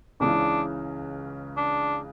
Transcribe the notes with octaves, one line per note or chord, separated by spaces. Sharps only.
C#2 C#3 E3 D4
D4